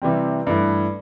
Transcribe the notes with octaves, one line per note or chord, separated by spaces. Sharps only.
C3 E3 G3 C4
G2 E3 A3 E4